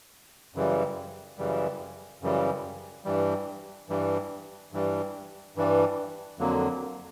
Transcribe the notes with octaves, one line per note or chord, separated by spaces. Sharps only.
F#2 C#3 E3 G3
F#2 C#3 E3 G3
F#2 C#3 E3 G3
G2 E3 G3
G2 E3 G3
G2 E3 G3
G2 E3 G3
F2 D3 F#3 A#3